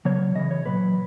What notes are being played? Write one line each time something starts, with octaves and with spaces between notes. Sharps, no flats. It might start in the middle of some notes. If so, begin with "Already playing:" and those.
C#3 F#3 C#5
C#3 E3 D#5
C#5
A#2 F#3 B4